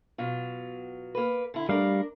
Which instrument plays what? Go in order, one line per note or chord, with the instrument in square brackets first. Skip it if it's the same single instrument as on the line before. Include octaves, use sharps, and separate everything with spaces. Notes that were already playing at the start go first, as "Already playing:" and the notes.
[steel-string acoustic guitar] B2 F#3 F4
A#3 B4
D3 E4
[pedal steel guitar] G3 F5 [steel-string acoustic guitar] A3 D4 A#4